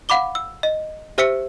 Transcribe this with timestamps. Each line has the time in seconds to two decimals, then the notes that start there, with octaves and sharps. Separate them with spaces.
0.09 F5 F#5 B5 D6 G7
0.35 E6
0.63 D#5
1.18 G4 C5 E5 E6 B6 C#7